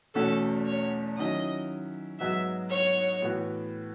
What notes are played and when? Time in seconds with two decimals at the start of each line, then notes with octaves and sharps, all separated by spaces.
0.15 E2 B2 A3 C#4 F#4 A4
0.66 C#5
1.18 D#3 F#3 C#4 E4 D#5
2.20 G#2 F#3 B3 D#4 F#4 E5
2.71 C#5
3.22 A2 E3 B3 F#4